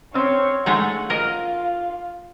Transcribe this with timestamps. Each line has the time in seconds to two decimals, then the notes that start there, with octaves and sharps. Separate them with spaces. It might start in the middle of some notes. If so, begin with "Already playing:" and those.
0.14 C4 C#4 C5 C#5
0.66 G#3 A3 D#4 F#5
1.10 F4 A#4 D#5